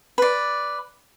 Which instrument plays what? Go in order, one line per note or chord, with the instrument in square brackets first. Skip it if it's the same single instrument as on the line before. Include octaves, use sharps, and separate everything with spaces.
[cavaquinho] B4 D5